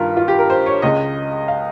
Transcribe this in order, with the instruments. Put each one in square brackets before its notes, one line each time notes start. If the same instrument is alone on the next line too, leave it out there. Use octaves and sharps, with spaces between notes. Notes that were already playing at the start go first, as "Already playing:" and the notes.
Already playing: [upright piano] G2 D#3 G3 F4 A#4
F4
G4
A#4
C5
C#5
C#2 C#3 G#3 D#5
F5